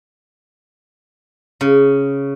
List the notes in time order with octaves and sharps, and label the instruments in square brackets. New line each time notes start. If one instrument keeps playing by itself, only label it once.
[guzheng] C#3